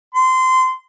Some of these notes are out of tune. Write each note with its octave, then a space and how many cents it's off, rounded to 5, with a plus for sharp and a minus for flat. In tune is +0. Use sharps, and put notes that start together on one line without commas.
C6 -20